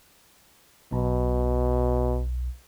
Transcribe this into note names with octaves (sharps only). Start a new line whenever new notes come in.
B1 B2